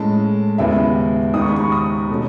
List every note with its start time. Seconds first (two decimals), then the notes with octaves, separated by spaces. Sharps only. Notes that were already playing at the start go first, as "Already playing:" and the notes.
Already playing: A2 G#3 C#4 A5
0.58 D#2 C#3 G#3 B3 E4 E5
1.34 D#2 C#3 G#3 D#4 D#6
1.42 C#6
1.49 B5
1.56 C#6
1.72 D#6
2.09 B2 A3 C#4